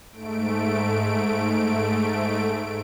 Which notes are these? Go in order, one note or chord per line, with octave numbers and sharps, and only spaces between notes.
G#2 A3 D7